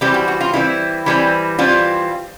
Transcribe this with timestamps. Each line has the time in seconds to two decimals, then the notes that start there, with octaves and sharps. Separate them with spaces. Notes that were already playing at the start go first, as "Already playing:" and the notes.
0.01 E3 G3 C4 G4
0.14 F#4
0.28 F#4
0.41 F4
0.54 E3 G3 C4 E4
1.06 E3 G3 C4
1.59 E3 G3 C4 F4